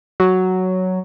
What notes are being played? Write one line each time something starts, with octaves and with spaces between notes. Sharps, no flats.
F#3